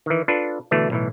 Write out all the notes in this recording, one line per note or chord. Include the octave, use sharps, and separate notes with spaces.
D#3 E3
D4 F4 A4 B4
B2 D3 E3 A3 D4
B1 A2 E3